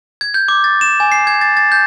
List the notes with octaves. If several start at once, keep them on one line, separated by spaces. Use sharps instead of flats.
G#6
G6
D6
A6
E7
G#5
C7
G#6
A6
A6
G6